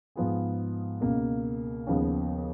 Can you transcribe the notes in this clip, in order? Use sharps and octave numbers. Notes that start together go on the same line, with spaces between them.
G#2 F3 B3 F4 G#4
C#2 B2 A#3
D#2 C#3 F3 B3